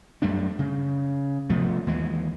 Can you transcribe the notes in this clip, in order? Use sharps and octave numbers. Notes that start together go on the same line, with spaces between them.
F#2 G3 A3 D4
C#3
C3 F3 A3 B3
D#2 E3 G#3